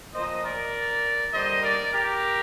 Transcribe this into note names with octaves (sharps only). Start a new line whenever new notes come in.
A#2 F3 A#3 C5 D#5
A#4 D5
D3 G3 A#3 C5 D#5
A#4 D5
G4 A#4